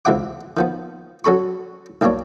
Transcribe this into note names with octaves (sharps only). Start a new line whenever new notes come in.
C#2 C3 E3 E5 F#5 D6
D#3 F3 B3
F#3 C#4 A4 B5 C#6
B1 G2 A#3 D4 C#5